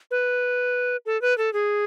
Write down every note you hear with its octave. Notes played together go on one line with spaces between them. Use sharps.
B4
A4
B4
A4
G#4